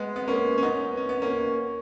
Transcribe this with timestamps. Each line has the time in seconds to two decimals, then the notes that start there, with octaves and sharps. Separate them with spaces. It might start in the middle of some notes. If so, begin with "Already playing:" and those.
Already playing: G#3 B3
0.16 B3
0.28 A#3 C#4
0.58 C#4
0.63 B3 D#4
0.97 C#4
1.09 B3
1.22 A#3 C#4